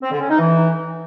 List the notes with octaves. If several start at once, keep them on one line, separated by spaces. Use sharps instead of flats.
C4
D3
C#4
D#4
E3